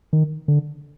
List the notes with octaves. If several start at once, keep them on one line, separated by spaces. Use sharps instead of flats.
D#3
D3